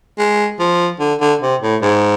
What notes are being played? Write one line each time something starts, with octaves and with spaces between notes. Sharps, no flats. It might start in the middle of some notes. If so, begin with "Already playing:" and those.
G#3
F3
D3
D3
C3
A2
G#2